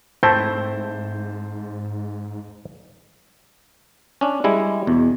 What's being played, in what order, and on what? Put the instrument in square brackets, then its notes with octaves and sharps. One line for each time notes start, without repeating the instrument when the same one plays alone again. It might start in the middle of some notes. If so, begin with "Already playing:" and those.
[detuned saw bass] G#2 [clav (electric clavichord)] A3 C4 E4 [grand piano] C5 [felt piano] A5 G6
[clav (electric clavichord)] C#4 D4
G3 G#3 E4
[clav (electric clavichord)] E2 [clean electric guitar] B2